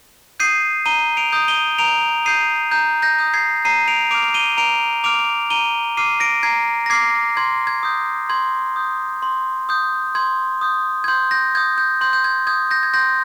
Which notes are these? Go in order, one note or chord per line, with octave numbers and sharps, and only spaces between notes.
D#6 G6 C7 D#7
A#5 D#7 G7
D7 F7
D#6 G6
D#7 G7
A#5 D7 F7
D#6 G6 C7 D#7
A#5 G6
G6 A#6
D#6 G6
G#6 C7
A#5 C7 D#7
D7 F7
D6 F6 D7 F7
D#7 G7
A#5 D7 F7
D6 F6 D7 F7
A#5 D#7 G7
D6 F6 C7 D#7
A#6 D7
A#5 G#6 C7
A#6
D6 F6 G#6 C7
C6 G#6
G#6
D#6 G6
C6 G#6
D#6 G6
C6
D#6 G6
C6 G#6
D#6 G6
G#6
C6 G6
G6 A#6
D#6 G6 G#6
G6
C6 G6
G6
G#6
D#6 G6 G#6
G6 A#6
G#6
C6 G6 A#6